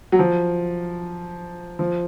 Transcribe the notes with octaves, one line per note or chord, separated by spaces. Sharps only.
F#3
F3
F3